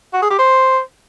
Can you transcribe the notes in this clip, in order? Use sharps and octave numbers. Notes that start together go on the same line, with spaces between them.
F#4
G#4
G4
C5